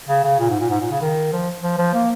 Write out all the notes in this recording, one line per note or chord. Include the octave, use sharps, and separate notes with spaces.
C#3
C#3
A#2
G#2
A#2
G#2
A#2
C#3
D#3
F3
F3
F3
A#3